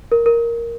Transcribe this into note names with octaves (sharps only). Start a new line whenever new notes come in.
A#4
A#4